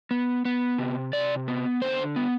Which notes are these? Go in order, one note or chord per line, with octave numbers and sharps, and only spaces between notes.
B3
B3
C3
C3 D5
B3
D3 C5
B3